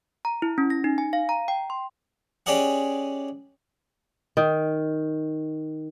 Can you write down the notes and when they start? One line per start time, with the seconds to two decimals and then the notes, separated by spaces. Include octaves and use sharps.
0.25 A#5
0.42 E4
0.58 C#4
0.70 A#6
0.84 D#4
0.98 G#5
1.13 F5
1.29 A#5
1.48 G5
1.70 C6
2.46 C#4 G4 G#4 D5 D#5 F#5
4.37 D#3